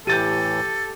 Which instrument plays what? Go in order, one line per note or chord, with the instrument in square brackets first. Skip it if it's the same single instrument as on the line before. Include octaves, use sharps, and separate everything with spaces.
[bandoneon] A2 E3 [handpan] G4 [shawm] A4 [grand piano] G6 A6 D#7